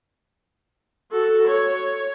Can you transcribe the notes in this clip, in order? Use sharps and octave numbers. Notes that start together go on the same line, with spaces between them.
F#4 A4
C#5